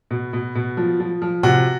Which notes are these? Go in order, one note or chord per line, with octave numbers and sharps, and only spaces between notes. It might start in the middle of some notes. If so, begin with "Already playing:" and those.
B2
B2
B2
F3
F3
F3
C3 F#4